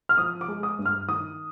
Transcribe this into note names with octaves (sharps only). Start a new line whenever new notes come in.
F6
F3 D#6
D6
G#3
D#6
G2
F6
D#3 D#6